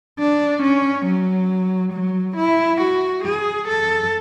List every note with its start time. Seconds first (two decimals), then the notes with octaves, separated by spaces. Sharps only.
0.19 D4
0.63 C#4
1.06 F#3
1.94 F#3
2.37 E4
2.81 F#4
3.25 G#4
3.68 A4